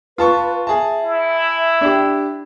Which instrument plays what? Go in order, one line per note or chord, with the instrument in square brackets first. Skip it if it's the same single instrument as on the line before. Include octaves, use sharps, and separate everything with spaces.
[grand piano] F4 A5 C#6 [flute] B4
[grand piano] G#4 A5 [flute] E5
[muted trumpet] E4
[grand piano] D4 G4